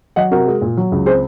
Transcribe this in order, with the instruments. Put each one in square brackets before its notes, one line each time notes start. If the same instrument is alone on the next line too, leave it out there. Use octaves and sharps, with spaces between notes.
[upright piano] F#3 D#5 F#5
C3 F#4 A#4
G#3
A#2
F#3
C#2
C4 G#4 C5